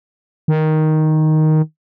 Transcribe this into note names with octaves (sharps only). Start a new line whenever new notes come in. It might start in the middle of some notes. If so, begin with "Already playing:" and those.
D#3